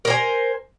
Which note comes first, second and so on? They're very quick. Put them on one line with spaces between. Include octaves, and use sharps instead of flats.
A#4 C5 G#5